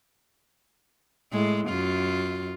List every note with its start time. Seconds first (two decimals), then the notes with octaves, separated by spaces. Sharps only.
1.33 A2 G#3
1.68 F#2 F4